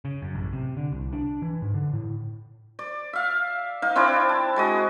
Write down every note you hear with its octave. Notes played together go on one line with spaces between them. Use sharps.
C#3
F#2
A1
C3
D3
C2
D4
E3
G#2
D3
A2
D5
E5 F5
D#4 F5
C4 D4 E4 D5
A5
G#3 F#4 D#5